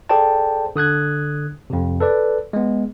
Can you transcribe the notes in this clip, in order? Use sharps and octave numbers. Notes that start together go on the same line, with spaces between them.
G#4 A4 C5 D5 G5 A5
D3 D#6 F#6 G#6
F2 C3
A4 B4 D5
G#3 B3